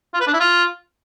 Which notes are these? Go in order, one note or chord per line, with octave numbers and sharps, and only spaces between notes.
F4
B4
D4
E4
F4